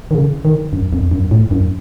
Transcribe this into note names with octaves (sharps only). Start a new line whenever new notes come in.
D#3
C#3
D#3
F#2
F2
F#2
A2
F#2